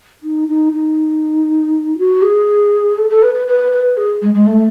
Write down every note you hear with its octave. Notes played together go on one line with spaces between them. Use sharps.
D#4
D#4
D#4
F#4
G#4
A4
A4
B4
B4
B4
B4
G#4
G#3
G#3
A3